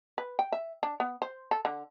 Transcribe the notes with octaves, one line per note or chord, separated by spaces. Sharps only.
B4
G5
E5
D4
B3
C5
A4
D3